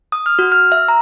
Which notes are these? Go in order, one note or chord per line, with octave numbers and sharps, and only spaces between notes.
D#6
F6
F#4
F6
E5
A#5